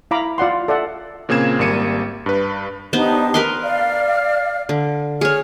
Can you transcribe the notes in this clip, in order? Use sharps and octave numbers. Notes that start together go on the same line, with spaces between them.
E4 F5 A#5 B5 D6
F4 D5 F#5 C6
A4 D5 E5 F#5
A#2 C#3 A#3 C4 G#6 E7
G#1 G3 A#3 C#7 D#7
G2 B4
B3 D4 D#4 G4 C5
A#4 B4 C6
D5 F5 F6
D3
G#4 C#5 F6